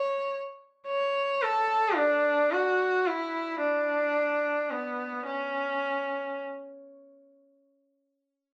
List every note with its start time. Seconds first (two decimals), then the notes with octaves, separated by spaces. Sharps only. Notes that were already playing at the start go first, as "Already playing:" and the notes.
Already playing: C#5
0.87 C#5
1.42 A4
1.96 D4
2.52 F#4
3.07 E4
3.61 D4
4.71 B3
5.27 C#4